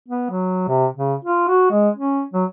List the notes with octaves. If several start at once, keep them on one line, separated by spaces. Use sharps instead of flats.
B3
F#3
C3
C#3
F4
F#4
G#3
C#4
F#3